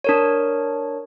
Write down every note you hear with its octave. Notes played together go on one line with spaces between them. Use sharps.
D4 A#4 C#5